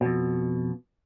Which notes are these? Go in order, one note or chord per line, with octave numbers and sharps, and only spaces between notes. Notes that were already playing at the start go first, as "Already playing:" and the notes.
F2 B2